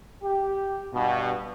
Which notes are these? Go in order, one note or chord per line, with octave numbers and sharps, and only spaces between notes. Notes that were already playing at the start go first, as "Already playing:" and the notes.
G4
G2 B2